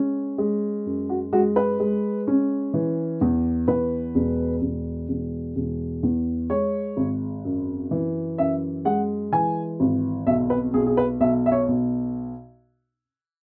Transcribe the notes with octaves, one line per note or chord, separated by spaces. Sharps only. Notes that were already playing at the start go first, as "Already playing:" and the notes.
Already playing: G#3 C#4
G#3
F#2
F#4
G#3 F#4
B4
G#3
C#4
E3
E2
E2 B4
E1
E1
E1
E1
E2
G#3 C#5
G#1
F#2
E3
F#2 E5
G#3 F#5
E3 G#5
G#1
B1 E5
B4
B1 G#4
G#4
B4
B1 E5
E5
C#5
B1